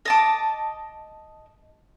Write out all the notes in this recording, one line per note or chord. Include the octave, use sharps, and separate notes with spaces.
D#5 A5 D6